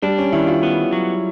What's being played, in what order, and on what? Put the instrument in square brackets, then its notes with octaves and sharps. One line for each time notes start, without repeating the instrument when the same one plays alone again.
[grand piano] G3 [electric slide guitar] D4
[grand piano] C#4
[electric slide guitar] D#3 [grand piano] E4
[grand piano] F4
[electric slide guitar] B3
F#3